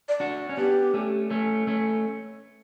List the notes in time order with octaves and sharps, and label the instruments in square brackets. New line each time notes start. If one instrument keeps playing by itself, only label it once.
[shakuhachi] D5
[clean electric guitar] D4 F#4
C#4
[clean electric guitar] B3 D4 [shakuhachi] G4
[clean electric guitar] A3 C#4
A3 C#4
A3 C#4